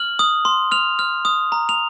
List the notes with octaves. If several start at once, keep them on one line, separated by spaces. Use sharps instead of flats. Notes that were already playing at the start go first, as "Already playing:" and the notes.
Already playing: F6 F#7
D#6
C6
F6 F7
F6
D#6
A#5
F7